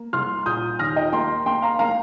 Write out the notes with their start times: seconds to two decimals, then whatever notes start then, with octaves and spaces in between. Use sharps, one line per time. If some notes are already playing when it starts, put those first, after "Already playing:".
Already playing: A#3
0.13 C2 C6 F6
0.46 A#2 D#6 G6
0.79 D#2 F6 A#6
0.96 D#5 G5
1.12 A#3 G5 C6
1.46 A#3 G5 C6
1.62 F5 A#5
1.79 A#3 F5 A#5